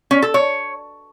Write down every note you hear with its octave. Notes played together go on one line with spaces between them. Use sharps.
C#4
A4
C#5